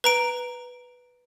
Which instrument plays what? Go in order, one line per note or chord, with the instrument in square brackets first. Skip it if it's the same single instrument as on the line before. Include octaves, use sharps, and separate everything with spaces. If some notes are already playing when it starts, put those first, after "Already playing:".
[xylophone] B4 A#5 D7